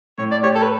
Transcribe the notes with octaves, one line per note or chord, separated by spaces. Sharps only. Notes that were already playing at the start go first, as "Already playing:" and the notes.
A2 C#5
D5
G4 C#5
A4
B4